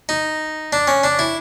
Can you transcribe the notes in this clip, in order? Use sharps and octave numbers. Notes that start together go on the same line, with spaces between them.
D#4
D4
C#4
D4
E4